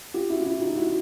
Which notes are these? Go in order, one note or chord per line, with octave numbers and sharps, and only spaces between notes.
F4 G4
E4 F#4
F4
E4 F#4
D#4 F4
E4 F#4